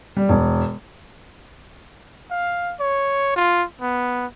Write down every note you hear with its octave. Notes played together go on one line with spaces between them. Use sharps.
G3
E1
F5
C#5
F4
B3